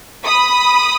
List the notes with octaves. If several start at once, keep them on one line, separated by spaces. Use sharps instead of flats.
B5 D#6